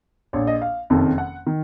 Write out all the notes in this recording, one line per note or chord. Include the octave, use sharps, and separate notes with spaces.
A#1 A#2 C#5
D#5
F5
F#1 F2 C3 D#3
F#5
D#3